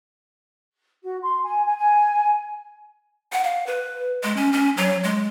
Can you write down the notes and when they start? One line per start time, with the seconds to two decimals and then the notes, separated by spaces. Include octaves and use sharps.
1.02 F#4
1.21 C6
1.44 G#5
1.64 G#5
1.77 G#5
3.32 F#5
3.44 F5
3.67 B4
4.23 G#3
4.36 C#4
4.53 C#4
4.77 F#3
5.04 G#3